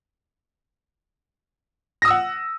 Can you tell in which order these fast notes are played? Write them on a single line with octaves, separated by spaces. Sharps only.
A#6 D#6 E6 F#5